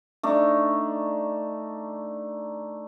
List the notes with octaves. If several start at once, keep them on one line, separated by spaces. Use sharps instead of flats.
A3 D4 D#4